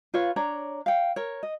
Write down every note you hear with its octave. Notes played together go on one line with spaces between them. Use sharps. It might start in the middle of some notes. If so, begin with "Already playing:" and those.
F4 B4 C#5 F5
D4 C#5 A#5
F5 G5
A#4 C#5
D#5